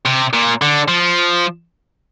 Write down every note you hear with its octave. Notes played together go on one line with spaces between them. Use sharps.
C3
A#2
D3
F3